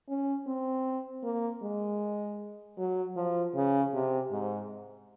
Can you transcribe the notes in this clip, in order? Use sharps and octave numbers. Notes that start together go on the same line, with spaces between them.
C#4
C4
A#3
G#3
F#3
F3
C#3
C3
G#2